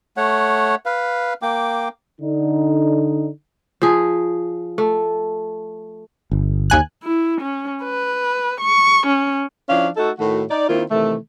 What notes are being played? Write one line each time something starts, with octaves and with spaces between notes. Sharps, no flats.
A3 C#5 F#5
B4 F5
A#3 G5 D6
D3 D#4
F3 G#4
A3
G1
D#2 G#5 F#6
E4
C#4
B4
C#6
C#4
F3 C#4 D4 E4 F5
A3 D#4 F#4 A4
A2 D#3 A3 F#4
D#4 D5
D#3 A#3 C4 E4 F4
C3 D#3 E3 A3